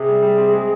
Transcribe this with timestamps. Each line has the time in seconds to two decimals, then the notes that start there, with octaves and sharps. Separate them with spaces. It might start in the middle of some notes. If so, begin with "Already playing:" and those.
Already playing: C3 G#4
0.08 G3
0.23 G3
0.38 C4
0.53 G#3